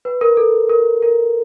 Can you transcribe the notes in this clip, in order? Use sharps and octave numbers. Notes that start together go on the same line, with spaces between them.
B4
A#4
A4
A#4
A#4